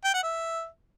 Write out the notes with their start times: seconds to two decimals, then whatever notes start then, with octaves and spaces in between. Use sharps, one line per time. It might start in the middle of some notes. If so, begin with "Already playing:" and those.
0.04 G5
0.13 F#5
0.23 E5